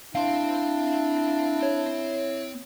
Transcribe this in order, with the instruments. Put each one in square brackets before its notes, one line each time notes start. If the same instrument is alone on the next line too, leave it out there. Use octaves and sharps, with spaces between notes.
[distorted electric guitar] C4 C6 [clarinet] D4 [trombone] E4 [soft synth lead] F5
[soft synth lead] C#5